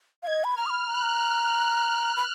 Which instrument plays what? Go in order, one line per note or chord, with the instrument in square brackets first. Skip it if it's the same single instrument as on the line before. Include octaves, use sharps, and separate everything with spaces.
[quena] D#5 F5 [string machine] G#6
[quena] B5
[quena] A#5 [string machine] F6
[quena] D#6
B5
[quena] A#5 [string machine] F#6
[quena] B5
A#5
B5